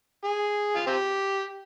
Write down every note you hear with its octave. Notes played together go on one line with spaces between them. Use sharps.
G#4
F4
C4 G4